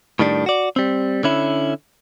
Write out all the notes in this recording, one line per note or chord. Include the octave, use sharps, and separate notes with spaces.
A2 D#3 G3 D4
F#4 D5
G3 C4
D3 C#4 E4